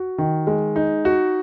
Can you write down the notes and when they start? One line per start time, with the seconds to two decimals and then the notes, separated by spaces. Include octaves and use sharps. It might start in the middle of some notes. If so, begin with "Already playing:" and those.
Already playing: F#4
0.18 D#3
0.47 G#3
0.76 D#4
1.05 F#4